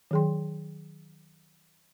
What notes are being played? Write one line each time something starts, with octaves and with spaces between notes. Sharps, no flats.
D#3 F#3 G#4 G5 C6